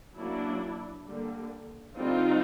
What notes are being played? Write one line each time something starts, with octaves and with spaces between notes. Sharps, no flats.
F#3 A#3 C#4 D4 E4
D3 G3 A#3
D3 G3 C4 D#4 F4